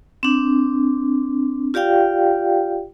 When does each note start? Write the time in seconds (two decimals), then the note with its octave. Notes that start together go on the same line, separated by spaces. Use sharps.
0.23 C4 D4
1.74 F4 G4 D5 F5 G5